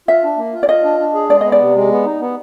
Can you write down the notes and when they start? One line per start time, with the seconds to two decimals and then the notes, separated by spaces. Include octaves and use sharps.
0.08 F4 E5
0.23 D4
0.38 A#3
0.54 F4
0.63 D5
0.69 F4 D#5
0.84 D4
0.99 D4
1.14 G#4
1.29 G#3 D5
1.41 B3 D#5
1.52 D5
1.60 C3
1.75 G#3
1.91 B3
2.06 D#4
2.20 B3